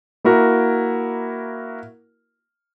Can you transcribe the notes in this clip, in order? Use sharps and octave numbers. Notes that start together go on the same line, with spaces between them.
A#3 E4 F#4 A#4